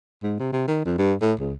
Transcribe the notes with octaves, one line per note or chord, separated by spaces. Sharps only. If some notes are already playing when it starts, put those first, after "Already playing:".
G#2
C3
C3
D#3
F2
G2
A2
C#2